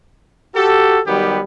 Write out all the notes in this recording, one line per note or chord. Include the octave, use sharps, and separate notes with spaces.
F#4 G4 A4
D#3 F#3 G3 B3 G4